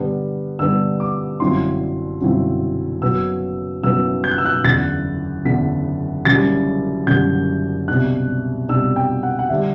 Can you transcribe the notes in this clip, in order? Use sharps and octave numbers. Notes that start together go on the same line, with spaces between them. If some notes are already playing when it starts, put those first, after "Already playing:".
Already playing: G2 D3 G3 B3 D4
G2 D3 G3 B3 D4 E6
D6
G1 F#2 F#3 C4 E4 C6
G1 F#2 F#3 C4 E4
F#1 F#2 F#3 B3 E6
F#1 F#2 F#3 B3 E6
G6
F#6
E6
F#6
F#1 E2 D3 A6
F#1 E2 D3 B6
F#1 F#2 D3 G3 A6
F#1 F#2 D3 G3 G6
C2 B2 G3 D4 F#6
C2 B2 G3 D4 E6
G5
F#5
F#5
D3 G3 D4 E5